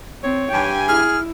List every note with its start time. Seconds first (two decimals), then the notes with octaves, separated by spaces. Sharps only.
0.24 C4 C#5
0.52 G2 G4 G5 G#5
0.88 E4 G#4 F6